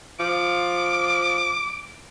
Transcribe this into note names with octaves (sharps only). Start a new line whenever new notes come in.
F3 D6